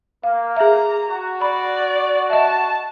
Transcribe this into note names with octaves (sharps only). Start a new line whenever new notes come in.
A#3 F5
G#4 E5 A#5
F#4
D5 B5
D#5 E5 A5